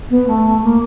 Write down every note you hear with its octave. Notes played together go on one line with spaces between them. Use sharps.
B3
A3
A#3